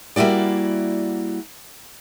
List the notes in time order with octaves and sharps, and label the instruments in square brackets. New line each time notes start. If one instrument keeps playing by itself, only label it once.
[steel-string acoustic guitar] G3 A#3 E4 F#4 D5